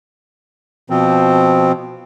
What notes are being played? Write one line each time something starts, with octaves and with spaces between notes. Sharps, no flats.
B2 F3 C4